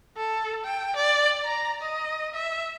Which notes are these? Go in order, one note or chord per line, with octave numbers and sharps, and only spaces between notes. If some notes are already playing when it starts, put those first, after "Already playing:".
A4
G5
D5
A#5
D#5
E5